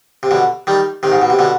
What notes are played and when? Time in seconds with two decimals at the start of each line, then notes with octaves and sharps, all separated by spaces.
0.23 C3
0.31 B2 D3
0.67 D#3 G3
1.03 C3 D#3
1.12 G#2
1.22 B2
1.30 C3
1.39 B2 D3